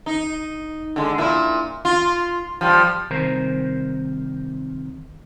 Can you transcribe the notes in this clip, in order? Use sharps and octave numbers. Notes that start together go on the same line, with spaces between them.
D#4
D3 G#3
A#2 E4
F4
F3 G3
C2 C3 D#3 A#4 C5 A#5